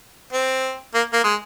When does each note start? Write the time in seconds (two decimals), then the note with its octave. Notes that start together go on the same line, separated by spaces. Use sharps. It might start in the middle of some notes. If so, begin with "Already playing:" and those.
0.33 C4
0.94 A#3
1.13 A#3
1.24 G#3